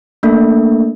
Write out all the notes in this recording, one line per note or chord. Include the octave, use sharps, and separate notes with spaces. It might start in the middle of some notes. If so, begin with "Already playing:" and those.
A3 A#3 D4 A4 E5